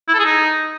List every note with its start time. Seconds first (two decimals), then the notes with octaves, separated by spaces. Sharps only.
0.08 E4
0.14 A4
0.19 G#4
0.25 D#4